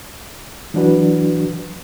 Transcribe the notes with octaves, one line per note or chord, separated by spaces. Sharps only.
E3 F#3 D4 F#4 B4